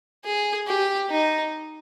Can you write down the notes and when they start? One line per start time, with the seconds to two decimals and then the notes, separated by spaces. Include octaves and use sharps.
0.25 G#4
0.68 G4
1.11 D#4